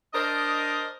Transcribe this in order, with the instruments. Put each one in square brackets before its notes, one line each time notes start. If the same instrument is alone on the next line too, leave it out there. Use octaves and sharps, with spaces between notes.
[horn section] D4 A#4 C5 D#5